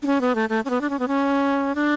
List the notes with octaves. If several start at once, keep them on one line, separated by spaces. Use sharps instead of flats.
D4
C#4
B3
A3
A3
C#4
B3
D4
C#4
B3
C#4
D4